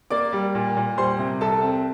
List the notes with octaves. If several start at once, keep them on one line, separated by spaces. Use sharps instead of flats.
A#3 D5 D6
G3
A#2
A#2
G3 C5 C6
C3
C2 A4 A5
C4